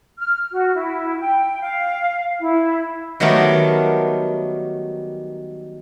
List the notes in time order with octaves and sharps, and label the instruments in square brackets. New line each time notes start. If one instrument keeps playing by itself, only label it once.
[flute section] F6
F#4
E4
G5
F5
E4
[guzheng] D#3 F#3 G3 A3 B3 A#4